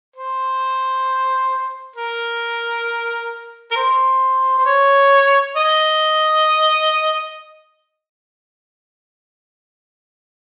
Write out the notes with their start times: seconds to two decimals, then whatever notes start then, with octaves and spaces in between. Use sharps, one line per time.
0.16 C5
1.96 A#4
3.71 A#4
3.76 C5
4.58 C5
4.66 C#5
5.57 D#5